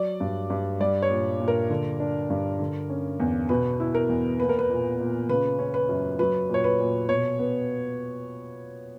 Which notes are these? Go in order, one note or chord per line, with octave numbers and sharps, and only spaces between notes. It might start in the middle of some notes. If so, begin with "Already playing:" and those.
Already playing: F#3 D5
G2
G2
G3 D5
C#5
A#2
A#2
A#4
D3
D4
G2
D3
C#4
E2
B2 B4
E4
A#4
E2
A#3 B4
A#4
B4
A#2
A#2
C#3 B4
C#4
B4
F#2
F#3 B4
A#2
C#5
B4
A#2
B2 C#5
B3